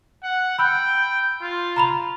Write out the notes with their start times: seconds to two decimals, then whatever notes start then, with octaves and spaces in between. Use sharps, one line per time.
0.23 F#5
0.59 G5 B5 E6 F#6
1.42 F4
1.76 A#5 B5 F7